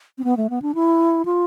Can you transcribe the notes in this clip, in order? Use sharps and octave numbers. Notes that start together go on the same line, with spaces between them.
C4
B3
A3
B3
D4
E4
F4